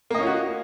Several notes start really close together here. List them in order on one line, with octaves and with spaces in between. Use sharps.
A#3 D#5 C#4 F4 F#4